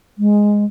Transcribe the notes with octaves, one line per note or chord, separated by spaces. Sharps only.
G#3